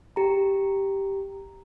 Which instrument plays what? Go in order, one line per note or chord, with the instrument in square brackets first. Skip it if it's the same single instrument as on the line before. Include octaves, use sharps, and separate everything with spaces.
[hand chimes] G4 A#5